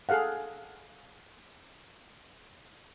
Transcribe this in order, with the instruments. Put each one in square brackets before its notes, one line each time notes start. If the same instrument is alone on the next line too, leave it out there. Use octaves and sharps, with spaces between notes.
[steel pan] G#4 A4 F5 F#5